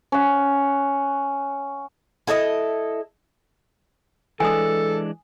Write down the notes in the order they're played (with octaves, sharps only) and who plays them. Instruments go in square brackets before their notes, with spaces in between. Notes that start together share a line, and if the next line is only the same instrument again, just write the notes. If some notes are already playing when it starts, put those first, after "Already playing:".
[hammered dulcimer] C#4 F#5
[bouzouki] E4 A4 D5 D#5
[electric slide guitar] E3 G#3 D4 [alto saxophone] A4 [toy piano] G#5 D#6